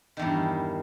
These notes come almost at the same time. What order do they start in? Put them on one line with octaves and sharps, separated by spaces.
D#3 E2 G2